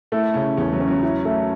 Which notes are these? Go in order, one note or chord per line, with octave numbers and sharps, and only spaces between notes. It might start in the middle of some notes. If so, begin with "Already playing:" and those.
A3 E4
C#3 C#4
E2 C#4
F#3
C#4
F#3
E4
A3